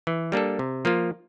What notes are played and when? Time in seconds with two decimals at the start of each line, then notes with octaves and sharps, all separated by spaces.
0.07 E3
0.32 G3 A#3 D4 A4
0.59 C3
0.85 F3 A#3 F4